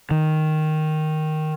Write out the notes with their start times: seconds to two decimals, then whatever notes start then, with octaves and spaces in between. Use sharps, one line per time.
0.11 D#3